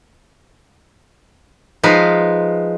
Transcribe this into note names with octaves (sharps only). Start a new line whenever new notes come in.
F3 G#3 D#4 B4 F5